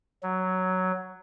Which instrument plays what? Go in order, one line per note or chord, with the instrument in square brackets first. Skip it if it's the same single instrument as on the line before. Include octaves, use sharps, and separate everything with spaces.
[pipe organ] F#3